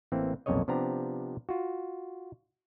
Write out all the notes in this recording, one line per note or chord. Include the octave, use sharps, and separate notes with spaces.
A1 E3 A#3 C4
B1 F2 A#2 C#3 C#5 D#5
C3 F3 B3 D4 G4 A#5
F4 F#4